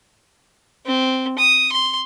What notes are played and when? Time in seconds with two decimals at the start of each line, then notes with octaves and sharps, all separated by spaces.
0.86 C4
1.38 D#6
1.72 C6